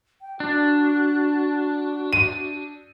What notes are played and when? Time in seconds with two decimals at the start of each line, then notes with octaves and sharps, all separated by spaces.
0.21 G5
0.40 D4 F#4
2.13 D#7